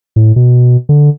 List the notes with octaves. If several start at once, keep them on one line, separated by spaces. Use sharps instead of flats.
A2
B2
D3